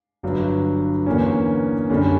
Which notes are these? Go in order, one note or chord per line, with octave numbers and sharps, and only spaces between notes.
G1 G2 F#3
E2 D3 A#3 C#4
F#2 D3 G3 C#4